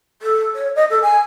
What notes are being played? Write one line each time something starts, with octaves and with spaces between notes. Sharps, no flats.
A4
C#5
D#5
A4
G#5